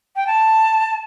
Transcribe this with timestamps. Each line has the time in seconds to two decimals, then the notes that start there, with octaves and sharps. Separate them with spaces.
0.16 G5
0.27 A5